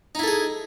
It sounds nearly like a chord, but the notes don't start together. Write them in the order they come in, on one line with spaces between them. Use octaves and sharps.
D#4 E4 A4 G#4